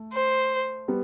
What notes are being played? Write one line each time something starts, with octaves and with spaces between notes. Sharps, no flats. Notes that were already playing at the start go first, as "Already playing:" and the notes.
Already playing: A3
C5
G3 B3